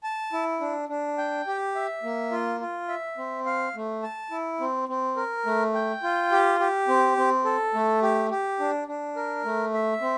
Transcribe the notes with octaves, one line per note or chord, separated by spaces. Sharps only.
A5
E4
D4
D4
G5
G4
E5
A#3
F4
F4
E5
C4
F5
A3
A5
E4
C4
C4
A#4
A3
G5
F4
G4
G4
C4
C4
A4
A3
G4
G4
D4
D4
A#4
A3
E5
C4